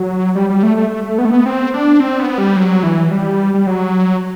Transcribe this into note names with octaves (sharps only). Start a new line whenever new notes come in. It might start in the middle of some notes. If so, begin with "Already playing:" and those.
Already playing: F#3
G3
G3
A3
A3
A3
A3
B3
A3
B3
C4
D4
C4
B3
G3
F#3
E3
G3
G3
F#3